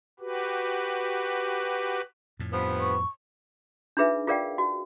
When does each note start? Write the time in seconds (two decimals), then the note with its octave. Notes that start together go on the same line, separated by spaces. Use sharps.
0.20 F#4 G4 B4
2.39 F2 A2
2.52 G2 F3 B3
2.81 C#6
3.97 D4 D#4 F4 G#4 B4 E5
4.27 F4 G#4 A#4 D5 F5 G5
4.58 F#4